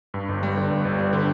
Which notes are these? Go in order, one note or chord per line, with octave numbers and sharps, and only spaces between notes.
G2
G1
G3
D3
G2
G1
G3
D3